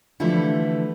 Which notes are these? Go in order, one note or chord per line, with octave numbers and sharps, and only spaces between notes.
D3 E3 F3 G3 A3 E4